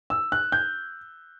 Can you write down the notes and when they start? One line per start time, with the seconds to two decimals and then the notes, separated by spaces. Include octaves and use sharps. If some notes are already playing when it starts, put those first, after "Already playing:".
0.10 E6
0.32 F#6
0.52 G6